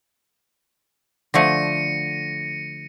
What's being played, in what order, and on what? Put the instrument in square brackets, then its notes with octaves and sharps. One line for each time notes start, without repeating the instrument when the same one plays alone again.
[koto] D3 F3 A3 [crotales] A#6 C#7 D#7